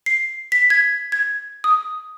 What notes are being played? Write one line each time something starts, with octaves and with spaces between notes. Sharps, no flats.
C7
B6
G#6
G#6
D#6